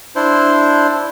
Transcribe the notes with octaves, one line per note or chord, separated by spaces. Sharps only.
D4 E4 C5